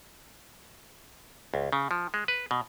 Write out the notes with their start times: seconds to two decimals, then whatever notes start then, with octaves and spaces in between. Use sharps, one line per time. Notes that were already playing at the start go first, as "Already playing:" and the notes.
1.54 C#2
1.73 C#3
1.91 F3
2.14 G#3
2.28 B4
2.51 B2